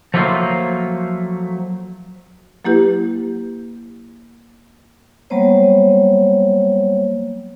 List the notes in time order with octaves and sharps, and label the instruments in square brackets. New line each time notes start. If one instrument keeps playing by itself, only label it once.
[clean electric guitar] F3 F#3 A3 A#3 F4 C5
[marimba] F#3 A#3 E4 G4 B4
[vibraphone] F#3 G3 A#3 B3 C5 C#5